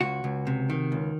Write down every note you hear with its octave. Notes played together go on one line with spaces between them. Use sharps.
C#2 F#4
C#2
C3
D#3
C#2